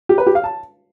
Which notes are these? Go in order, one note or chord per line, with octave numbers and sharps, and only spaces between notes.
G4
B4
G4
F5
A5